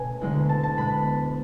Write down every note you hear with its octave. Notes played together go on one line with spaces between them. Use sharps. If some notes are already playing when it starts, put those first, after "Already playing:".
Already playing: B2 A3 C#4 G#5
D2 D3 G#3 B3 E4
A5
A5
B2 G#3 B3 B5